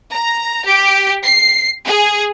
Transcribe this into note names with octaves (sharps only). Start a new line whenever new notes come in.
A#5
G4
C7
G#4